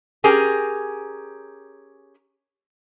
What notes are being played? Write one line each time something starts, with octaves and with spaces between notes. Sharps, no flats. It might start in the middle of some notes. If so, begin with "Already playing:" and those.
C#4 G4 G#4 A#4